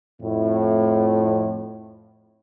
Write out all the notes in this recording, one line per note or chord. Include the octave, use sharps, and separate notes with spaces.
F2 A2